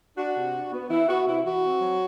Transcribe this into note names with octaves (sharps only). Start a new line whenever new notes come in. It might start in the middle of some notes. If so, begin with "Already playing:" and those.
D4 F#4
C3
D4
B3
E3 E4
B3 F#4
C3 E4
E3 F#4
C4
F#3